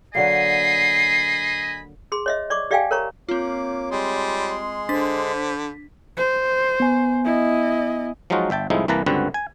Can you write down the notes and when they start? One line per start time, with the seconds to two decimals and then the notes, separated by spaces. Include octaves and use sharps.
0.15 D3 F#3 A#3 D#5 G#5 B5 C7
2.12 G#4 C6
2.26 C#5 D#5 E5
2.50 D5 C#6 D6
2.71 G4 D5 E5 F5 G5 G#5
2.91 A#4 C#5 A#5 C#6
3.29 A#3 C4 F4 C#5 D6
3.91 G3 G#3 G#4 C6
4.89 D3 D4 C5 B6
6.17 C5
6.80 B3 G#5
7.24 E4 D#5
8.30 F3 F#3 G#3 D#4 F4 F#4
8.50 G1 E5 G5 A5
8.70 C2 A2 F3 G#3 D#4 E4
8.88 C2 E3 A#3 B4 A5 A#5
9.06 C#2 G2 D3 C4 F#4 B4
9.34 G#5